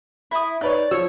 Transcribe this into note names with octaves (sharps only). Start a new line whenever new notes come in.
E4 D#6
D#4 B4 C#5 D5 G6
F3 C#5 E6